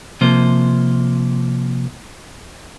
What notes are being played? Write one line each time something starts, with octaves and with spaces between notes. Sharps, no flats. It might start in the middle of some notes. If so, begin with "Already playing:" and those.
C3 F3 A#3 C5